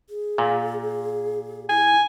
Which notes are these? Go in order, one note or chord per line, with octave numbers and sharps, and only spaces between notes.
G#4
A#2
E4 G#5